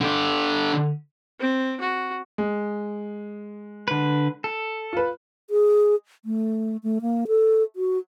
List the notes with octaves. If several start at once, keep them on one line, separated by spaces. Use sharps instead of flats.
D3 G4
C4
F#4
G#3
D3 B4
A4
F4 B4
G#4
A3
A3
A#3
A4
F#4